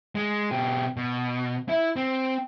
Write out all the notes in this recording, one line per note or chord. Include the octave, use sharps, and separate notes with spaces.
G#3
B2 G4
B2
E4
C4